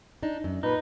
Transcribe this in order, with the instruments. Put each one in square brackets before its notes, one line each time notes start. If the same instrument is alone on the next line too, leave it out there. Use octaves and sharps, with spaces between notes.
[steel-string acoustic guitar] D4 D#4
F#2
[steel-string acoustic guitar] A#2 [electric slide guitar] D#4 [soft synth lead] B4